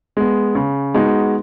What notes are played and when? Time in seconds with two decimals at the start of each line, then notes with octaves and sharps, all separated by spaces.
0.17 G#3 B3
0.55 C#3
0.94 G#3 B3 D#4 F#4